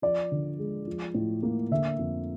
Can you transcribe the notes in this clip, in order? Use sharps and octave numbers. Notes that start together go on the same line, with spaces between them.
F3 D5
D3
G#3
F3
A2
A#3
D3 E5
F2